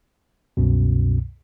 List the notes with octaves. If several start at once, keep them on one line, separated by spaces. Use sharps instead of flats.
C2 F#2 B2